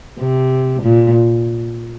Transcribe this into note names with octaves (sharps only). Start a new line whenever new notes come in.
C3
A#2